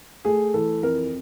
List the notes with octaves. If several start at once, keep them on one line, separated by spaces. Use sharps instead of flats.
A3 G#4
E3 A4
F2 A#4